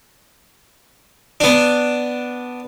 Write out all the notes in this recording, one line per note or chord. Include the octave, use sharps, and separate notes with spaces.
B3 D4